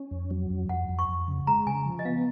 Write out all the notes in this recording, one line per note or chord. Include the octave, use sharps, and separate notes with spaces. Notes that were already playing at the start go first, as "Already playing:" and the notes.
Already playing: C#4
F2
F#3
F2
F2 F#5
F2
C#6
F2
C#3
G#3 A#5
C#3 G#5
F3
D#5
B3 F5